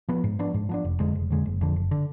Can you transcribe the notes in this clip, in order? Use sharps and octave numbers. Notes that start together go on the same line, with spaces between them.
F3 B3
G#2
F3 B3 D4
G#2
F3 B3 D4
F1
F2 D3 G#3
F1
F2 D3 G#3
F#1
F2 D3
F#1
D3